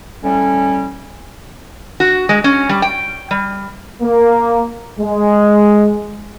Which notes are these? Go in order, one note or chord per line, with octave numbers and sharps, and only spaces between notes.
A2 G3 C#4
F#4
G#3
C#4
G3
G5
G3
A#3
G#3